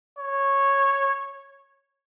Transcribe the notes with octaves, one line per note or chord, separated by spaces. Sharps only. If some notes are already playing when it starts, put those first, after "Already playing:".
C#5